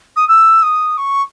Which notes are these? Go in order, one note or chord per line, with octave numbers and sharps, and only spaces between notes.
D#6
E6
D#6
C#6